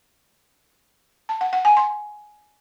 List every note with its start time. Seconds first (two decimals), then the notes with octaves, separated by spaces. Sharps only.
1.29 A5
1.41 F#5
1.53 F#5
1.65 G#5
1.77 C6